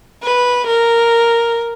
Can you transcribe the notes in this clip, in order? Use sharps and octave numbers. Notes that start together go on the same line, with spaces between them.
B4
A#4